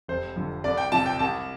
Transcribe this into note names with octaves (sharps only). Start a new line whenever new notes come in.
F1 C5
F2 D3
C2 D5
G5
C3 F3 A5
G5
C2 A5